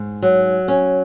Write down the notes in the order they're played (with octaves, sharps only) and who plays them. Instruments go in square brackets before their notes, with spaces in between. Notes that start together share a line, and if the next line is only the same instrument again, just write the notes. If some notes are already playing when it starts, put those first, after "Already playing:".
Already playing: [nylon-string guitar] G#2
F#3
C#4